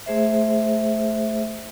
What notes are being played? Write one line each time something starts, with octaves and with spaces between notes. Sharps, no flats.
A3 G#4 C5 E5